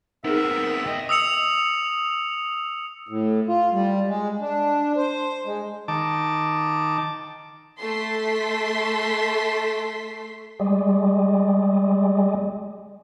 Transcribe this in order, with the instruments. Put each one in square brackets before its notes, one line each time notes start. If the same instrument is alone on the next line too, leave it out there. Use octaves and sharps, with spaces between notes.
[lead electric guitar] B3 C4 [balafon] D#4 G#4 [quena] A#4 [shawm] E5
[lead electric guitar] D2 D#5 [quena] G5
[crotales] D#6 E6 C#7 F7
[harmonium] A2
F4
G3
G#3
D4
C5
G#3
[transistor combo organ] D#3 A5 D6
[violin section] A3 A4 C6 B6
[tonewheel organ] G3 G#3